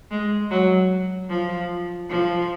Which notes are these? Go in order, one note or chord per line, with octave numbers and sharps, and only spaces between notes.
G#3
F#3
F3
F3